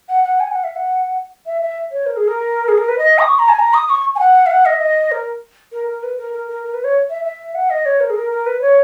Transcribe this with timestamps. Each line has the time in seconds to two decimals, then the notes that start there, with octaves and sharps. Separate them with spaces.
0.09 F#5
0.24 F#5
0.40 G#5
0.52 F#5
0.64 E5
0.76 F#5
1.46 E5
1.62 E5
1.92 C#5
2.06 A#4
2.17 G#4
2.28 A#4
2.68 G#4
2.78 A#4
2.88 B4
2.98 D#5
3.19 D#6
3.28 C#6
3.39 A#5
3.49 G#5
3.59 A#5
3.74 D#6
3.89 C#6
4.15 G#5
4.19 F#5
4.46 E5
4.50 F#5
4.66 D#5
4.73 E5
4.80 D#5
5.12 A#4
5.72 A#4
5.87 A#4
6.03 B4
6.18 A#4
6.34 A#4
6.49 A#4
6.64 A#4
6.74 B4
6.84 C#5
7.10 E5
7.24 E5
7.55 F#5
7.70 D#5
7.86 C#5
8.00 A#4
8.10 G#4
8.15 A#4
8.31 A#4
8.46 B4
8.62 C#5